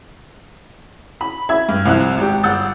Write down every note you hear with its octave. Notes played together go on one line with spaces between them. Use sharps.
B5
E5 B5 G#6
G2
C2 C3 F3 F#6
G#1 G4
G1 F#5 E6 G6 A6